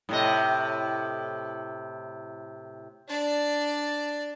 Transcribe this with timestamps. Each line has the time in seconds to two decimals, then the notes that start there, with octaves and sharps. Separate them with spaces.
0.09 A2 C3 D#5
3.08 D4 D5